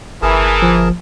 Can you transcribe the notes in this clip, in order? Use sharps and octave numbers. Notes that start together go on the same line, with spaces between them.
G1 E3 G#4 A#4 A5
F3